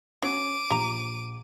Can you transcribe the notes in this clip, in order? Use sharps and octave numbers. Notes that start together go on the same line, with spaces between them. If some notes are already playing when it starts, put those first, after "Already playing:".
F#3 C#4 D6 D#7
A#1 G4 A#5